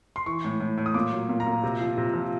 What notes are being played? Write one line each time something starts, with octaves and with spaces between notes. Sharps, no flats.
C6
E3 C#6
A2
A2
A2
D#6
A#2 D6
F#3
A#2
A#5
A#2
C3
F3
C3
F3